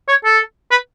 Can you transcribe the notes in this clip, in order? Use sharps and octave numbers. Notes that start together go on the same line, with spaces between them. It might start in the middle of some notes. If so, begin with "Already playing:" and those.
C#5
A4
B4